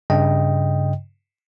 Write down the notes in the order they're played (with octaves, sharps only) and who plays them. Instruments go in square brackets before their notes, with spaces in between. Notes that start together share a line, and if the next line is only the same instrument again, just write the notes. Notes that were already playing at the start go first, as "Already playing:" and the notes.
[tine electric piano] G2 C#3 D#5 G5